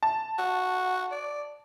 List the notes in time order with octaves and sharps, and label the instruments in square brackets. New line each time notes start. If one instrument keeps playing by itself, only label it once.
[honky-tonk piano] A5
[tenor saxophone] F#4
D5